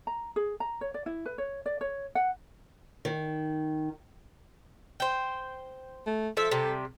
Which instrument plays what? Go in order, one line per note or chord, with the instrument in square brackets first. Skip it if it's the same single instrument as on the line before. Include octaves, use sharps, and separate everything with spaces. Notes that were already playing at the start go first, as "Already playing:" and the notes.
[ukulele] A#5
G#4
A#5
C#5
D5
E4
B4
C#5
D5
C#5
F#5
[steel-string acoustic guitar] D#3
[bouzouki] C5 G5
[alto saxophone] A3
[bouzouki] F3 E5 [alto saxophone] A4
[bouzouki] C3 G3